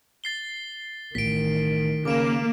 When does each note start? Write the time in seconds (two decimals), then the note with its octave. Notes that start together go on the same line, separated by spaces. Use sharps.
0.24 A6 C7 G7
1.15 A1 D#3 B6 D7
2.05 C#3 A#3 D6 D7 E7